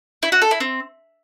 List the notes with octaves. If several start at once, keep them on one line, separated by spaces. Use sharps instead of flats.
E4
F#4
A4
E4
C4